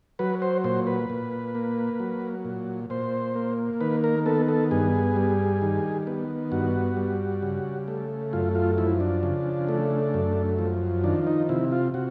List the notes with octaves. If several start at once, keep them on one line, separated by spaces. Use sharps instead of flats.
F#3 B4
C5
A#2 C5
B4
A#2
A#3
F#3
A#2
A#2 C5
A#3
D#3 B4
A#4
B3 A4
A4
G2 G#4
G3
D#3
B3
G2 F#4
G3
C#3
A3
F#2 F4
F4
F3 E4
D4
C#3
A3
F#2
F3
D#3 D4
D#4
C3 E4
F4
C3 F#4